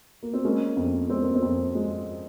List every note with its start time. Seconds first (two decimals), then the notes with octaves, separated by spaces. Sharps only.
0.23 A#3
0.34 C4
0.45 G#3 A#3 C#4
0.77 F2
1.10 G#3 C4
1.22 A#3
1.35 C4
1.42 F2
1.75 G#3